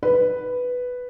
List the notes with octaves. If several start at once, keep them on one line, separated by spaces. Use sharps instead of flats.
B4